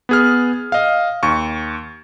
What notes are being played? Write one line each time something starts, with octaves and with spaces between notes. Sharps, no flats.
B3 G#4 F6
D#5 F5
D#2 C#6